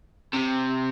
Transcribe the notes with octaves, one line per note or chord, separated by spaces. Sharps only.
C3